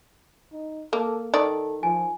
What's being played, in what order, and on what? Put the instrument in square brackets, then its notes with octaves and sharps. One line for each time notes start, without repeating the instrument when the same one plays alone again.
[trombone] D#4
[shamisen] A#3 [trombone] A4
[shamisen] D#3 D5 [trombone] A4
[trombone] F3 [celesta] G#5